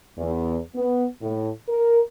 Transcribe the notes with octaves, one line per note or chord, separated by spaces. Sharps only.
E2
B3
A2
A#4